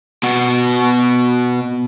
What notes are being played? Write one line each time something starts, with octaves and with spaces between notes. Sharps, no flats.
B2 F#4